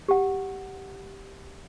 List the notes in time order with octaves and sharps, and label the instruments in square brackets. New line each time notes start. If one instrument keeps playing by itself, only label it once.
[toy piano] G4 F#5